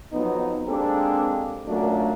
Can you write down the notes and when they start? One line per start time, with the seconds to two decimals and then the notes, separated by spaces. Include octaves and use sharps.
0.13 F2 F#3 B3 D#4
0.67 G#3 A#3 C4 D4 G4 A4
1.67 F#2 A#2 F#3 A3 A#3 D4